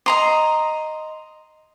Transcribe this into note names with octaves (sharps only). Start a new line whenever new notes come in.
D#5 A#5 C6